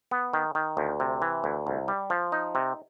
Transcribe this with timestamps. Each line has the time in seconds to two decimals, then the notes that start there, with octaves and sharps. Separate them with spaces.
0.11 B3
0.33 D#3
0.55 D#3
0.77 D2
1.00 C3
1.22 E3
1.44 D2
1.67 C2
1.88 G3
2.10 F3
2.32 D#4
2.55 C3